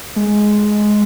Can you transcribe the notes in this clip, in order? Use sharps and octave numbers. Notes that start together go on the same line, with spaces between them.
G#3